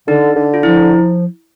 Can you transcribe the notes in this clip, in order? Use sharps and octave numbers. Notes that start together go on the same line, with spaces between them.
D3 D#4
D3
F4
F3 E4